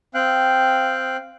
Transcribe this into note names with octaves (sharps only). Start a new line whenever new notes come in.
C4 F5 G5 F#6